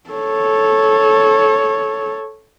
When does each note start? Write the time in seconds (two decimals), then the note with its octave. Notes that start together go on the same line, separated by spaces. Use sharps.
0.10 A4 C#5